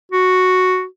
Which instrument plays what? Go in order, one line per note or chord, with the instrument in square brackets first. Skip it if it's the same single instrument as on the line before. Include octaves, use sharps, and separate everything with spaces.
[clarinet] F#4